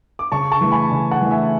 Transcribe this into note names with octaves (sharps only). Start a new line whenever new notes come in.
D6
C#3 A5 C#6
A5 C#6
E3 A3
G#5 B5
C#3
F#5 A5
E3 A3
E5 G#5